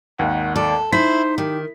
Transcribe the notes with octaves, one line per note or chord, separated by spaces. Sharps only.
G#1 D#2 F#5
A4 D5
D#4 E4 C5 B6
D#3 G4